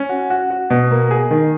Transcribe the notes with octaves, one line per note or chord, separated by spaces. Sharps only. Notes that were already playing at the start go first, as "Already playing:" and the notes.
Already playing: C#4
F#4
F#4
F#4
B2
A#3
G#4
D#3